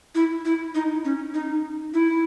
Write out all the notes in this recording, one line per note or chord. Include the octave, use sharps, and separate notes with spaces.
E4
E4
D#4
C#4
D#4
E4